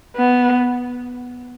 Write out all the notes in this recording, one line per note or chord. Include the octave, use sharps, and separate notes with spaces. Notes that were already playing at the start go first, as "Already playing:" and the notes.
B3